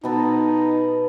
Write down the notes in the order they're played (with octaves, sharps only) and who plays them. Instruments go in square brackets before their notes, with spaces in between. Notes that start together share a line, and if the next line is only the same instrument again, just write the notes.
[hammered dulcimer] B2 B3 A4 [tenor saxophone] D#4